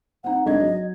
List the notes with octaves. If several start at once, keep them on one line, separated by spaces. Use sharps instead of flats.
C4 D#4 F#5
G#1 D4 D#5 G#6
F#3